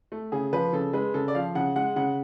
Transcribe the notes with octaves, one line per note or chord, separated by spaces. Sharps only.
A3
C#3 G#4
F3 B4
C#3 A4
G#3 B4
C#3 A4
D5
F3 F5
C#3 F#5
G#3 F#5
C#3 F#5